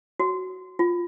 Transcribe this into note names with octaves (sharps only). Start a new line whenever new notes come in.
F#4
F4